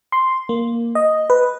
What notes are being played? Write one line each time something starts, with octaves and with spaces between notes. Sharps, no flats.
C6
A#3
D#5
B4